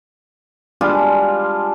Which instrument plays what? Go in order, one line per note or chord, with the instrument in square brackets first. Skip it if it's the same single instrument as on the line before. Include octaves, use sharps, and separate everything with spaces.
[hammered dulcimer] G3 G#3 D4 F4